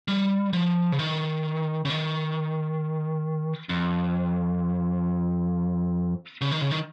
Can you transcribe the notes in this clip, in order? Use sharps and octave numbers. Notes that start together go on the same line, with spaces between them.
G3
F3
C#3
D#3
C#3
D#3
F2
C#3
D#3
C#3
D#3